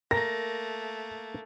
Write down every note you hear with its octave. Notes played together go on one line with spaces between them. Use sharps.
A3 A#3 A#4 A#6